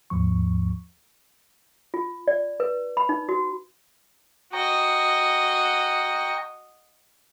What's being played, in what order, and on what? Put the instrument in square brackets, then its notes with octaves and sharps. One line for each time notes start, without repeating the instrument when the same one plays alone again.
[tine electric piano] D#2 G#2 F3 C#6
[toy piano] F4
D5
B4
B5
D#4
F#4
[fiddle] F#4 D#5 [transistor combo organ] G5 A#5 C#6